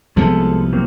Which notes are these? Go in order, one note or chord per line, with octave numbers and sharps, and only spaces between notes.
C2 F3 G#3 B3 A4
F#3 A#3 C4